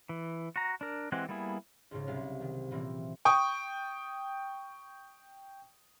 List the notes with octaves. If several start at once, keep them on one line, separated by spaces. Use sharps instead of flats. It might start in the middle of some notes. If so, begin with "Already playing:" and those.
E3
F#4 A#5
D4 A#4
E3 G#3 C4 G4 F#5
G3 A#3 B3 E4 G#4
C#2 G#2 C#3
C2 C3 F#3 F5
D#3
A#2 E3 A#3 C4
G5 C#6 D#6